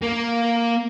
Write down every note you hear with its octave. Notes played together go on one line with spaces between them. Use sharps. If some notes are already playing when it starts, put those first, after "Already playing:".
A#3